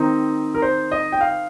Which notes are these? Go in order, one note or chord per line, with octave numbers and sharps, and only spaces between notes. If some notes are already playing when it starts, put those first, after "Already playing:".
Already playing: D#3 C4 D#4
A#4
C5
D#5
G5
F5